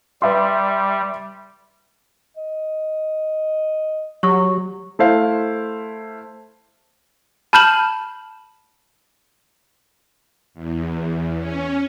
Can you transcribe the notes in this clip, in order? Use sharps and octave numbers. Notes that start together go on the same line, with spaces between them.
G3 B4 E5 C6
D#5
F#3 G4 C#5 C#6
A3 E4 C5 F5
A5 B5 F6 G6 E7 F#7
E2
C#4